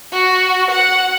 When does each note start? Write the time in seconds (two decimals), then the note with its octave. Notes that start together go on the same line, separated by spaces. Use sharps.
0.12 F#4
0.71 F#5